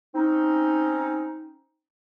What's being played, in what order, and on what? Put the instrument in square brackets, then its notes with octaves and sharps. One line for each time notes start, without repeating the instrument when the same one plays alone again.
[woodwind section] C4 C#4 D#4